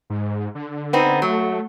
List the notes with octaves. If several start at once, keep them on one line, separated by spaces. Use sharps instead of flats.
G#2
D3
B3 C4 D#4
F#3 A3